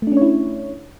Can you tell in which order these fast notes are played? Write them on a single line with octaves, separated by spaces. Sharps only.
A3 D4 C#4 C#5 E4